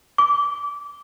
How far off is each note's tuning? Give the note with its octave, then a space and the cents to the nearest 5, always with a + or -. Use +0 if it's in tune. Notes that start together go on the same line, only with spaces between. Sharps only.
D6 -25